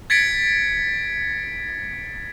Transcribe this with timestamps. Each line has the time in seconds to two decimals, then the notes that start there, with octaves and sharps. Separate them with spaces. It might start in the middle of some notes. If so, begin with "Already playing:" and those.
0.10 G#6 A6 B6 C#7 D7